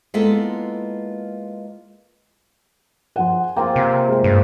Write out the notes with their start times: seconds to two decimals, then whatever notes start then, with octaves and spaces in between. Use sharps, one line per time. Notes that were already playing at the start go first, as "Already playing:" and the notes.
0.14 G#3 A#3 B3 E4 F4 A4
3.16 F3 F#5 G#5 C6
3.56 A#3 C4 F4 G5
3.76 C3
4.09 G#3
4.24 G2